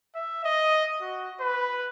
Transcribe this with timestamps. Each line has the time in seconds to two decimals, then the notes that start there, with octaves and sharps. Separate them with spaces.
0.15 E5
0.45 D#5
1.01 F#4
1.41 B4